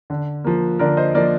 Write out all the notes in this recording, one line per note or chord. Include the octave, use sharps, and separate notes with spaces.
D3
F3 A#3
D3 A#4 D5
C5 D#5
F3 A#3 A#4 D5